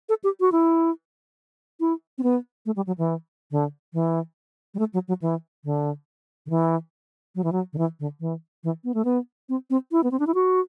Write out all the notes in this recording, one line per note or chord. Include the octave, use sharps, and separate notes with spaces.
A4
G4
F#4
E4
E4
C4
B3
A3
G3
F#3
E3
D3
E3
G3
A3
F#3
F#3
E3
D3
D3
E3
F#3
E3
F#3
D3
E3
D3
E3
E3
B3
A3
B3
C4
C4
E4
B3
C4
D4
E4
F#4